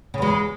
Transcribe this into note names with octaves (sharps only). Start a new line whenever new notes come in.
E2 C#3 G#3